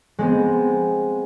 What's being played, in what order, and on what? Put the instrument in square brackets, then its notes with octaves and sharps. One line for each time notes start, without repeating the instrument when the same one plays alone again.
[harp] G#3 B3 C4